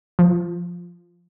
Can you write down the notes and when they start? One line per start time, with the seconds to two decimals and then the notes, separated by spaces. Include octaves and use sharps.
0.19 F3